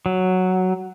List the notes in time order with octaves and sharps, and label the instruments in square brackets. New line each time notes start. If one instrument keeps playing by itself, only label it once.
[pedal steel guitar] F#3